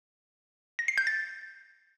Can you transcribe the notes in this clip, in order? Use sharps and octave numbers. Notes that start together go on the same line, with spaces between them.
A#6
C7
G6
A6